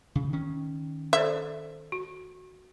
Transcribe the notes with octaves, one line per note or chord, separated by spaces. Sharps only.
C#3
D#3 C#4
A4 C5 D5 E5
F#4